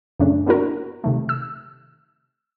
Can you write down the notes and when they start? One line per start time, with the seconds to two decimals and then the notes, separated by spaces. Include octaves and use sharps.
0.19 F#2 A#2 C#3 A3 C#4 D4
0.46 A#3 B3 D4 E4 F#4 A#4
1.04 C3 D#3 A3
1.29 E6